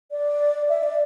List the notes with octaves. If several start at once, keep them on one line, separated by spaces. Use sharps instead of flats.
D5
E5
D5